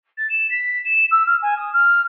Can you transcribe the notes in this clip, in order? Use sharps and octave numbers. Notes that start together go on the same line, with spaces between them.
A6
E7
B6
E7
E6
F6
G#5
D#6
F6